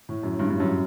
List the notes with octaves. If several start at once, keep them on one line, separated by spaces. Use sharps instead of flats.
A2
F#2
G2
G2
F#2